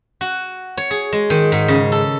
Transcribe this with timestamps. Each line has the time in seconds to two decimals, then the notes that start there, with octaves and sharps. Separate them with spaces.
0.21 F#4
0.77 C#5
0.91 G#4
1.13 G#3
1.30 D#3
1.52 G#2
1.68 C#3
1.92 A4